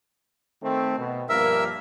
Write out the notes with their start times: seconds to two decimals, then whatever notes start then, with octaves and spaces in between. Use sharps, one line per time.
0.62 D#3 A3 C4
0.98 B2
1.29 G2 F3 A#3 A#4 E5 E6